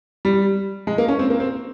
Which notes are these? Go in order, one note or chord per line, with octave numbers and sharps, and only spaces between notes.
G3
G#3
A#3
C#4
C4
A#3
C4